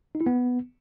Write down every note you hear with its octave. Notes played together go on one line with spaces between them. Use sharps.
D#4
E4
B3